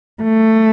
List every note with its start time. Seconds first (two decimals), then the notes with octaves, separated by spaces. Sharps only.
0.23 A3